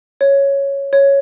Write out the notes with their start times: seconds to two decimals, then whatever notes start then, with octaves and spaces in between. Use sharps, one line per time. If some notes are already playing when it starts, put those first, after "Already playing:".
0.21 C#5
0.93 C#5